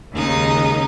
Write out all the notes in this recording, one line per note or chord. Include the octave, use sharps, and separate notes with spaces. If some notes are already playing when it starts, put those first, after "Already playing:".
D#2 C#3 G#3 D#4 D#6